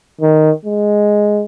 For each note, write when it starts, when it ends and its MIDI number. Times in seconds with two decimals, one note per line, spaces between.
0.21 0.51 51
0.65 1.44 56